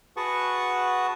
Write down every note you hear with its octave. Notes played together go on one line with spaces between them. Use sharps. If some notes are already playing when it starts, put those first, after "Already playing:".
F#4 G#4 B4 F#5 A5 C#6